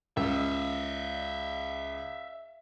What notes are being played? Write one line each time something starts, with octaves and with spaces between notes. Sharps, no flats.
C#2 E5 F5